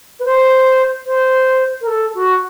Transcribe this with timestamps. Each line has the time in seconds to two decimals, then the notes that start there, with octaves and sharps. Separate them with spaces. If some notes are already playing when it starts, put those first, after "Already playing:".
0.20 B4
0.25 C5
1.06 C5
1.81 A#4
1.87 A4
2.15 F#4